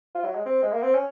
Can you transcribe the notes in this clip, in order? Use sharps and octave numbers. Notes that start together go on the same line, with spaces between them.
F4
F#3
G#3
C4
G#3
A#3
C4
C#4